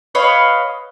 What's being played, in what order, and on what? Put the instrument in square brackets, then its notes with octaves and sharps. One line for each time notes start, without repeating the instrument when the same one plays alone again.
[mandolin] B4 C#5 D#5 F5